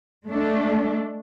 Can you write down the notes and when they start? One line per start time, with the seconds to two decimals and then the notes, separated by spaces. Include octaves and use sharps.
0.25 G#3 A3 D4 A4